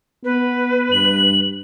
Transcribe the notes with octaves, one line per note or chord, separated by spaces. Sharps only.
B3 B4
G2 F#7